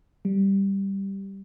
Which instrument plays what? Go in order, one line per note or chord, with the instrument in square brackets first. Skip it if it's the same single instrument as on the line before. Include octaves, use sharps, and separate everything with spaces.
[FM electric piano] G3